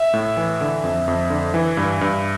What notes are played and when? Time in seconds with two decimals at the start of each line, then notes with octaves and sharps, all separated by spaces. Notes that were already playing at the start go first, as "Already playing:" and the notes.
Already playing: E5
0.14 A2
0.37 E3
0.61 D3
0.83 F2
1.08 F2
1.30 D3
1.54 E3
1.77 G2
2.01 G2